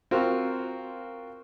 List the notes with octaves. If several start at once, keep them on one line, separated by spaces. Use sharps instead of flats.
C4 F4 F#4 A#4